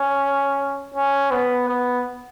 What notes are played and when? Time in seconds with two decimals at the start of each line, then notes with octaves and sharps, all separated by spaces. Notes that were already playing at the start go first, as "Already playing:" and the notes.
Already playing: C#4
0.94 C#4
1.31 B3
1.68 B3